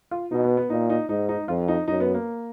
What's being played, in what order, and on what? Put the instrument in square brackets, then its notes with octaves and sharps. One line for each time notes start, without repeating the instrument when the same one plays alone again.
[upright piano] F4
[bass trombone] B2 [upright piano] D#4
[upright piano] B3
B3
[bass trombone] A#2 [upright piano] D#4
[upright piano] D#4
[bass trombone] G#2 [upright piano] D#4
[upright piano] D#4
[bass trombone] F2 [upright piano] F4
[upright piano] D#4
[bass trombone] F#2 [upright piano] D#4
[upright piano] B3
A#3